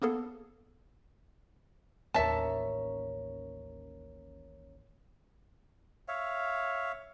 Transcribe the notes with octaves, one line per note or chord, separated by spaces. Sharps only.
A#3 B3 G#4 A4
A1 D#2 C#4 A#4 C#5 E5 A5
C#5 E5 F5